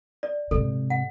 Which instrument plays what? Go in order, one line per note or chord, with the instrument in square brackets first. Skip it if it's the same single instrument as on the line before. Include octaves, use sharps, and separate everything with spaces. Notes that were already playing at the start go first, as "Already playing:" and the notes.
[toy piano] D5
[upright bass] G#2 C3 [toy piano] A4
[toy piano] F#5